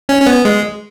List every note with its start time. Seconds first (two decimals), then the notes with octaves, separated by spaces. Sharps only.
0.09 C#4
0.22 C#4
0.26 B3
0.45 G#3